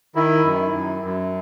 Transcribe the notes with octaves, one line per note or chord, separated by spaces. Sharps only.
D#3 E4
F#2
F#2
F#2